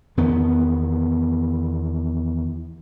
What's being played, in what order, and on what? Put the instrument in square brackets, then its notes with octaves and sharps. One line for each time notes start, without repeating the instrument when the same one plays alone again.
[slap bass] E2 D#3 B3